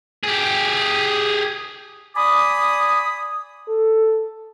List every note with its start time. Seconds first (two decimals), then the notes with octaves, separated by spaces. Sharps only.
0.24 G4 G#4
2.16 D5 G#5 B5 D6 D#6
3.68 A4